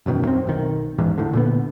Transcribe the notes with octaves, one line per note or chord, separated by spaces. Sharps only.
E1 F#2 B2 D#3
F#2 C4
B1 D#3
A1 E2 G#2
A2 D3
A#2 D3 B3